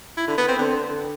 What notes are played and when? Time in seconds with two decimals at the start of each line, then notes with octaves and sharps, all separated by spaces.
0.17 E4
0.27 D3
0.38 B3
0.48 C4
0.59 D3